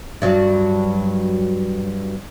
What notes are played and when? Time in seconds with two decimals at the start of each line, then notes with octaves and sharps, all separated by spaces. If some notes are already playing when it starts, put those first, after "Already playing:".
0.22 G2 F#3